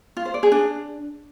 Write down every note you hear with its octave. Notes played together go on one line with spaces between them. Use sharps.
F4
C5
D5
G#4
D4